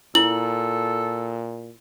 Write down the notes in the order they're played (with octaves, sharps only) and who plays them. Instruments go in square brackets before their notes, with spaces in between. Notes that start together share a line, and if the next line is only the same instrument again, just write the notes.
[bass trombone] A#2 [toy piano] E4 [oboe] A4 [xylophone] F#7